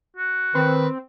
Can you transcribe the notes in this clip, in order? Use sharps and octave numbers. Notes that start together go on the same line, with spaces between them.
F#4
D#3 C4 B4